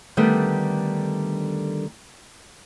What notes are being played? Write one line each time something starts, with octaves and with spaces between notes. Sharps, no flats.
D3 D#3 G3 A3 B3 D4